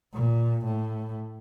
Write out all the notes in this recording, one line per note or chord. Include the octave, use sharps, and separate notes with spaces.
A#2
A2